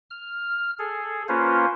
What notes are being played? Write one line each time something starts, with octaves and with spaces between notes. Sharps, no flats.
F6
G#4 A4
A#3 C#4 F4 B4 C5